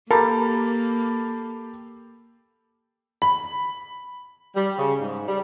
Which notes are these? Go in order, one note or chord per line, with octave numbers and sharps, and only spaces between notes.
A#3 G4 A4 A#4 A5 B5
B5
G3
C#3
G#2
G3